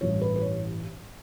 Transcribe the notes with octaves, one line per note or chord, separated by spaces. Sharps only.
A1 G2 E3 C#5
B4
B4
C#5